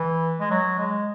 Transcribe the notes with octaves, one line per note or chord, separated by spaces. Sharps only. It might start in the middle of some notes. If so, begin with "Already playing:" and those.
Already playing: E3
G#3
F#3
G#3